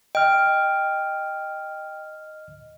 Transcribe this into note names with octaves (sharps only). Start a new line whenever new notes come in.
D#5 G5 F6